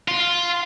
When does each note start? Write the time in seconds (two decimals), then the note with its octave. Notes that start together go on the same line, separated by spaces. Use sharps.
0.08 F4